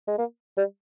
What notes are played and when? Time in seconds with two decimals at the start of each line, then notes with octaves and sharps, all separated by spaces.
0.08 G#3
0.18 A#3
0.57 G3